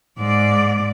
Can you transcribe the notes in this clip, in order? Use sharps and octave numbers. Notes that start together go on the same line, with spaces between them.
G#2 D5